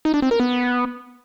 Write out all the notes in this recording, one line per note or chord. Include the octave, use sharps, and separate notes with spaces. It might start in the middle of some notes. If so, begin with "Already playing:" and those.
D#4
D4
C4
A#4
B3